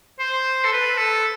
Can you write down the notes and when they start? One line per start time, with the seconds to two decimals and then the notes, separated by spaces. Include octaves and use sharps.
0.19 C5
0.65 A4
0.72 B4
0.98 A4